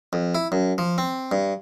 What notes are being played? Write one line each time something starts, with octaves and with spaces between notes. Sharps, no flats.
F2
E4
F#2
F3
C4
G2